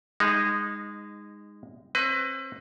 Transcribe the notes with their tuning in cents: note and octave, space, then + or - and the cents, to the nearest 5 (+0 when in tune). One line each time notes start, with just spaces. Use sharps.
G#3 -20 D#4 +0
C4 +35 B4 +25